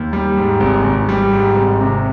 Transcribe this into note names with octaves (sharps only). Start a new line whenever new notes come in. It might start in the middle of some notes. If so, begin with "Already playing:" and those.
Already playing: D#2
G3
G#2
G#1
G#1
G3
G#2
G#1
C3